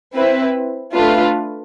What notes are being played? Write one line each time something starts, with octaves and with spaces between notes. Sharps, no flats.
C4 E4 B4
A3 D4 F4 B4